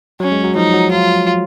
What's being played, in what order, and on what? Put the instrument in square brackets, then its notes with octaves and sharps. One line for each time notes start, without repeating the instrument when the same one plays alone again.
[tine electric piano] F#3 [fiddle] C#4
[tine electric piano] G#3
F#3
[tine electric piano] F3 [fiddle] D#4
[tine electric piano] F#3
[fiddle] F4